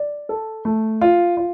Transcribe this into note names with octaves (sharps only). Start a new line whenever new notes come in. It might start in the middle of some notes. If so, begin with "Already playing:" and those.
Already playing: D5
A4
A3
F4
F4